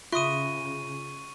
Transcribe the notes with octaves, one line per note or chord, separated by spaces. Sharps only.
C#3 F4 E5 C6 C#6 D#6 D#7